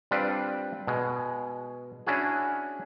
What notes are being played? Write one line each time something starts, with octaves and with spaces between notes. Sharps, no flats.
G3 C4 D4 F4 B4 D5
B2 G#3
C#4 D4 E4 F#4 G#4